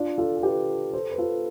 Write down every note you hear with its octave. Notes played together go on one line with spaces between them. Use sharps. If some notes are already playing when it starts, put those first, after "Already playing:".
Already playing: D4 F4
F4 A4
A4
G4 B4
A4 C5
B4
F4 A4